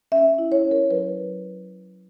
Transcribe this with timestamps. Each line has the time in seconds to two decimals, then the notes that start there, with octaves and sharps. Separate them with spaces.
0.12 C#4 E5
0.38 E4
0.52 C#5
0.65 C#4
0.71 A#4
0.90 F#3 B4
1.17 F#3